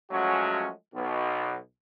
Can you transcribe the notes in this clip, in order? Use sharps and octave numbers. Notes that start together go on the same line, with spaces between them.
F3 F#3 G#3 A3 C#4 F#4
B1 B2